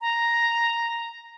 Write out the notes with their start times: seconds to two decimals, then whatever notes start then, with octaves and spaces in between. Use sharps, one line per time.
0.01 A#5